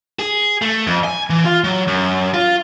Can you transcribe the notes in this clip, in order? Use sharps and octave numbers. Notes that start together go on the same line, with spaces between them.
G#4
A3
F2
G#5
E3
F4
F#3
F#2
F4